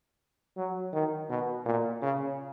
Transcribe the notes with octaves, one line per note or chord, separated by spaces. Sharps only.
F#3
D#3
B2
A#2
C#3